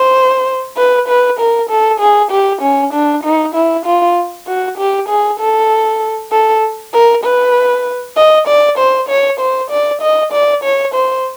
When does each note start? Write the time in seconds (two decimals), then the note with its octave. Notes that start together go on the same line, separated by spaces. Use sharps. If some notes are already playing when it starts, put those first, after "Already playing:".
Already playing: C5
0.77 B4
1.08 B4
1.40 A#4
1.70 A4
2.00 G#4
2.31 G4
2.62 C#4
2.93 D4
3.24 D#4
3.55 E4
3.86 F4
4.47 F#4
4.78 G4
5.09 G#4
5.40 A4
6.32 A4
6.94 A#4
7.24 B4
8.17 D#5
8.48 D5
8.79 C5
9.09 C#5
9.40 C5
9.70 D5
10.02 D#5
10.32 D5
10.64 C#5
10.94 C5